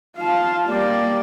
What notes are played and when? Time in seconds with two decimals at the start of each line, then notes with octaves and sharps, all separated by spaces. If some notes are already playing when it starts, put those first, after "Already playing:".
0.17 F4 F5 A5
0.69 G3 A#3 D5